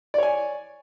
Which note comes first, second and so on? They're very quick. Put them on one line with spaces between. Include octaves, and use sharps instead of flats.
D5 C#5 G#5